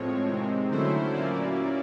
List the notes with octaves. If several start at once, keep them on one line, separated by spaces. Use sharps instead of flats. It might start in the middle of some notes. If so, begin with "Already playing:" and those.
Already playing: A2 F3 G#3 C4 C#5
C3 D#3 G#3 C4
D3 F#3 A3 C#4 E4 C5
A#2 F#3 A#3 C#4 E4 D5